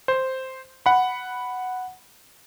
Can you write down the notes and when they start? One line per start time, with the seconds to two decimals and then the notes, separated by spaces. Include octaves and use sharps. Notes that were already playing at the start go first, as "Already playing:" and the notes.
0.08 C5
0.86 F#5 B5